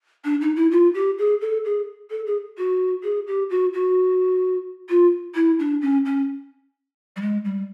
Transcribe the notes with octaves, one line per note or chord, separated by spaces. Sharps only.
D4
D#4
E4
F4
G4
G#4
A4
G#4
A4
G#4
F#4
G#4
G4
F#4
F#4
F4
E4
D4
C#4
C#4
G3
G#3
G3